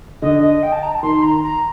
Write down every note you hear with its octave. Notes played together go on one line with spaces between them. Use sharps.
D3 D#5
D#5
G5
A5
A#5
A5
D#3 C6
A#5
A#5